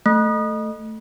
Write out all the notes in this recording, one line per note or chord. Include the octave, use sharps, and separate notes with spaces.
A3